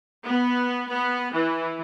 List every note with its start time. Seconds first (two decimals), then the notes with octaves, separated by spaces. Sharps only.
0.25 B3
0.91 B3
1.34 E3